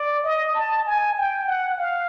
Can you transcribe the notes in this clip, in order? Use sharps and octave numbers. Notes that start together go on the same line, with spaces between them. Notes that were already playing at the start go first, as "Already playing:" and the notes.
Already playing: D5
D#5
A5
G#5
G5
F#5
F5